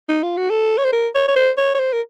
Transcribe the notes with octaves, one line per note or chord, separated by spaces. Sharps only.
D#4
F4
F#4
A4
C#5
C5
A#4
C#5
C#5
C5
C#5
C#5
C5
A#4